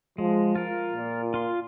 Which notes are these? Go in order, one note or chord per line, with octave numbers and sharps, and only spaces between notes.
F3 G#3
F4 A#4
A#2
F4 C6